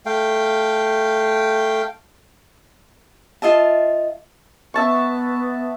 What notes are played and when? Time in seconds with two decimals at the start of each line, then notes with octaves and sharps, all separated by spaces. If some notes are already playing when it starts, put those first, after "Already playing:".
0.06 A3 F5 G5
3.42 F4 D#5 E5 A5
4.74 B3 E5 A5 C#6